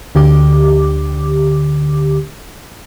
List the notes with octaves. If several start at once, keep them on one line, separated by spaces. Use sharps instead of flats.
D2 D3 G4 D6